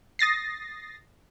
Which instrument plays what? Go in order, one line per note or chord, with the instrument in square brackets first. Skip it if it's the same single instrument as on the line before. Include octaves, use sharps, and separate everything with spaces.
[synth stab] D#6 A6 A#6 C7